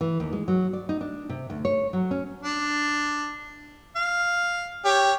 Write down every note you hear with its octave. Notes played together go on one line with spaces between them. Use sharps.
E3
D#2
G#3
F#3
D5
D#4
D4
C3
D2
C#5
F#3
C#4
D4
F5
G4 C#5